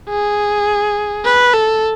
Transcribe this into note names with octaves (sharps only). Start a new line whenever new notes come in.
G#4
B4
A4